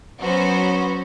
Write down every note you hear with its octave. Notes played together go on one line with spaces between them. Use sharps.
F#3 B3 C#4 F#4 C5